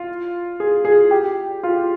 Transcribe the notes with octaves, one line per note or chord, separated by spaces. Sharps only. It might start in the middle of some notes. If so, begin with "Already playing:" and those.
Already playing: F4
G#4
G#4
G4
F4